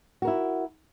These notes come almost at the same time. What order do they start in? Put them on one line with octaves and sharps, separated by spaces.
F#4 A#4 E4